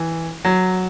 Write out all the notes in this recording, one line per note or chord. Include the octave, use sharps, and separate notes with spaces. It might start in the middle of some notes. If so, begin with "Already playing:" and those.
Already playing: E3
F#3